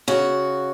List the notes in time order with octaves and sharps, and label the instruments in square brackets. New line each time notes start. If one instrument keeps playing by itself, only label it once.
[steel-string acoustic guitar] C#3 F#4